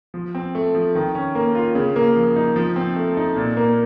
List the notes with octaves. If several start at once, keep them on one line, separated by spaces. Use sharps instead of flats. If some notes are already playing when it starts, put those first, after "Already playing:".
F3
C4
A3
F3
D#3
C#4
A#3
F4
C#3
A#3
F3
D#4
F3
C4
A3
D#4
A#2
A#3